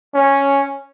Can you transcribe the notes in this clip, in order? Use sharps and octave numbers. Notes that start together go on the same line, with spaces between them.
C#4